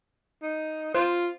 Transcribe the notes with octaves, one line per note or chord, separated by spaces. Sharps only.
D#4
F4 C5